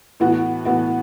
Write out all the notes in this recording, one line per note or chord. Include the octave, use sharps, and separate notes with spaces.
A2 E3 B3 F#4
A2 E3 B3 F#4